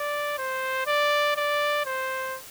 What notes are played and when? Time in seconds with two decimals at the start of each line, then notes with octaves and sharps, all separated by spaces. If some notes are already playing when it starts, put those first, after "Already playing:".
Already playing: D5
0.38 C5
0.87 D5
1.36 D5
1.86 C5